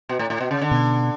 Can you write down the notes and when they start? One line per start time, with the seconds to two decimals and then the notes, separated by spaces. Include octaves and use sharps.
0.09 B2
0.19 A2
0.30 A2
0.41 B2
0.51 C#3
0.61 D3
0.71 B2